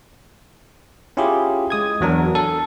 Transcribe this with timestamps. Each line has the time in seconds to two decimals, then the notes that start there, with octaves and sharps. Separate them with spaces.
1.17 C#4 E4 F4 G4 G#4
1.70 G#3 D#6 G#6
2.01 E2 F#3 D4 A#4
2.35 A4